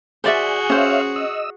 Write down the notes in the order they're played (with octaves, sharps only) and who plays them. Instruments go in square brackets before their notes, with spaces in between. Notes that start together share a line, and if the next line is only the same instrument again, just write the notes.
[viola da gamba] F#4 G#4 [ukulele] C5 D5 E5 [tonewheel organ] G#5 G6
[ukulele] C#4 C5 [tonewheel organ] C#5 E5 F5
[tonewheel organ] D#5 E6